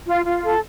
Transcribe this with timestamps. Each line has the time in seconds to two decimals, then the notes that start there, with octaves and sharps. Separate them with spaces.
0.06 F4
0.25 F4
0.44 A4